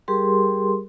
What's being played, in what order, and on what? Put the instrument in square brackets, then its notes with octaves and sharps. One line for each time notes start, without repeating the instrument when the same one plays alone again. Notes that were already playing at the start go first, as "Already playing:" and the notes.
[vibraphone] G3 G4 G#4 A#4 C6